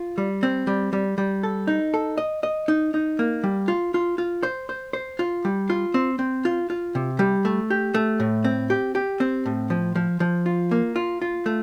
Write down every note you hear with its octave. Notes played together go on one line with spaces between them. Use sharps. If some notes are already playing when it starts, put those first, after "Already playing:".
Already playing: F4
G3
C4
G3
G3
G3
A4
D#4
A4
D#5
D#5
D#4
D#4
A#3
G3
F4
F4
F4
C5
C5
C5
F4
G3
F4
C4
C4
F4
F4
C3
G3
A3
G4
A3
A2
C4
G4
G4
C4
A2
F3
F3
F3
F4
A#3
F4
F4
A3